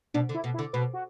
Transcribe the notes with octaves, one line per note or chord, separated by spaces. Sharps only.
B2 D4
D3
E4
B2
E4
D3
B2 B4
F#4